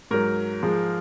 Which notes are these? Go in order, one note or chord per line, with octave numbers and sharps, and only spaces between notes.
G#2 F#3 A#4
G#2 F3 G#3